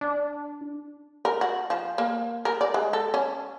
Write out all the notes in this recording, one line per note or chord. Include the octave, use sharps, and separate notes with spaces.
D4
A#4
F#4
F3
A#3
A#4
D5
G#3
A4
C#4